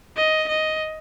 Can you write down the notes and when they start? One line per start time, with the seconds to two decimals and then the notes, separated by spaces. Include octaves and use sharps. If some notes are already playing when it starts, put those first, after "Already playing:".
0.17 D#5
0.49 D#5